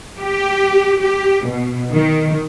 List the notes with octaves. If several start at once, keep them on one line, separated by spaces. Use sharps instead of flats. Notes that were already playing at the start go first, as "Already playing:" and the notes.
G4
G4
B2
D#3